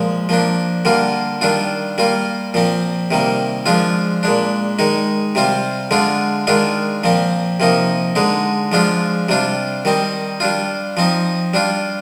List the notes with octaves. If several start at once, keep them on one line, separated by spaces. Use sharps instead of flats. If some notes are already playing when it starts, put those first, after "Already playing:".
Already playing: A#2 F3 G#3
F3 A#3 D4
D3 G3 A#3 F4
D#3 G3 D4 F4
G3 A#3 F4
A#2 F3 C4
C3 D#3 G3 A#3
F3 G#3 D4 F4
A#2 G#3 D4
D#3 G#3 D#4
C3 G3 C4 F4
D3 G#3 D4 F4
D#3 G#3 D4 F4
A#2 F3 C4
C3 F3 A#3 D#4
D3 G#3 D#4
F3 G#3 D4 F4
C3 G3 D4 F4
D#3 G3 C4 D#4
G3 D4 F4
F3 C4 D#4
G3 D4 F4